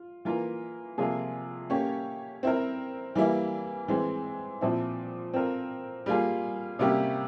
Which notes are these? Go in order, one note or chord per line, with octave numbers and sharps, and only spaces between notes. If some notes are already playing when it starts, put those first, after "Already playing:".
Already playing: F4
E3 A#3 F4 A#4
C3 F3 A#3 F4 G#4
A#3 C#4 G4 C#5
C4 E4 A#4
E3 G3 A#3 E4
E3 G#3 C4
A#2 F3 C4 E4
C4 F4 A#4
G3 A#3 F4 G#4
C3 G3 A#3 C#4 G4